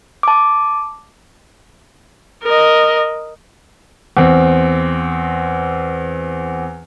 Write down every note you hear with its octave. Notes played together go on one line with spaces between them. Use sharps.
A5 D6
A#4 D#5
E2 C4